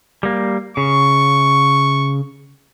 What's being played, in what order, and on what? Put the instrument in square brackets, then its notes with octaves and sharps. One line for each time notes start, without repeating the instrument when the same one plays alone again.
[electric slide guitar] G3 A#3
[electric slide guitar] C#3 [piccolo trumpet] C#6